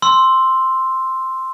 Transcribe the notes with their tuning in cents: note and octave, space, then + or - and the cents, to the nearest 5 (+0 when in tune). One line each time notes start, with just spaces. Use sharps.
C6 +0 E6 +0